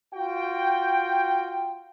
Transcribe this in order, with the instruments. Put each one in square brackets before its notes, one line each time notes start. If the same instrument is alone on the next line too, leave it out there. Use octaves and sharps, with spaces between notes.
[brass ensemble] F4 F#4 G5